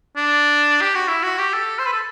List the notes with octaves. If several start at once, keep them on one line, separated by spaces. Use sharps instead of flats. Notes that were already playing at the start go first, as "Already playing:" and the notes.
D4
G4
F#4
E4
F#4
G4
A4
C5
B4
A4